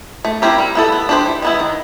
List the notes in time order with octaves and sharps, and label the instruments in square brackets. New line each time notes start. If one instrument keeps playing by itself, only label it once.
[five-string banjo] A3
C4 E4 G4 A#4
G3
B3 E4 A4
B3
D4 G4 C5
E3
G#3 B3 E4
D#3